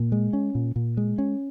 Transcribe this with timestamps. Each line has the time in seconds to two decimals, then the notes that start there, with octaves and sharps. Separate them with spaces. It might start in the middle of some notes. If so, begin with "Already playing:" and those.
Already playing: A#2
0.12 G#3
0.33 C#4
0.55 A#2
0.76 A#2
0.97 G#3
1.18 C#4